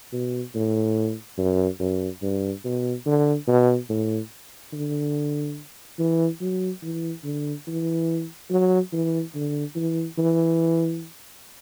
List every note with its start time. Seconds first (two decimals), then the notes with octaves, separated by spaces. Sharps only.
0.13 B2
0.55 A2
1.38 F#2
1.79 F#2
2.22 G2
2.64 B2
3.06 D3
3.47 B2
3.90 A2
4.73 D3
5.99 E3
6.41 F#3
6.82 E3
7.24 D3
7.67 E3
8.50 F#3
8.93 E3
9.35 D3
9.75 E3
10.18 E3